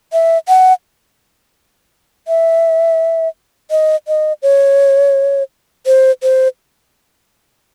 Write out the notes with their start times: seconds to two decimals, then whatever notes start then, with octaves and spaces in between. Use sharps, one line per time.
0.13 E5
0.48 F#5
2.28 E5
3.71 D#5
4.08 D#5
4.43 C#5
5.86 C5
6.23 C5